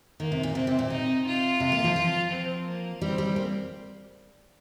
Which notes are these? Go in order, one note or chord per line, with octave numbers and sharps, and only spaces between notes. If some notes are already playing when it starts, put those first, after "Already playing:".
D#3 A#3
C3
A#2
C3 C4
C3
A#2
C3 D#4
F4
C3
A#3
F3
F3
C4
A#3
G3 C4
G3
A#3